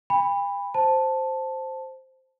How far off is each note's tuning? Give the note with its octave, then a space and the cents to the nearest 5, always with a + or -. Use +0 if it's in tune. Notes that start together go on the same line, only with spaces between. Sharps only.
G5 +45 B5 +0
C5 +0 A5 +0